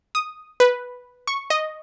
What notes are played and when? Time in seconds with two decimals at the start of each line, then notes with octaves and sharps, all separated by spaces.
0.15 D#6
0.60 B4
1.27 C#6
1.50 D#5